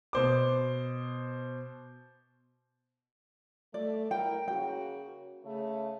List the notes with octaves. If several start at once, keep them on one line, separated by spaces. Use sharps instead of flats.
B2 C5 D6
A3 D5
E4 A#4 G5
C#3 A#3 F#4 G5
C#3 A3